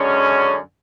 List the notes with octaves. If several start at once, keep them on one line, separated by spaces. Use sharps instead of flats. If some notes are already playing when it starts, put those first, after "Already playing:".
Already playing: F#2 D3 G#3 C#4